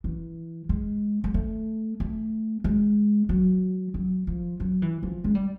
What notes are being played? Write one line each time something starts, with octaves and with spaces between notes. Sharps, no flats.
E3
G#3
G#3
A3
A3
G#3
F#3
F#3
F3
F#3
E3
F3
G#3
G3